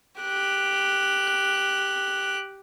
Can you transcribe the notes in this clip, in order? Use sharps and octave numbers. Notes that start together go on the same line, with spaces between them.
G4 F#6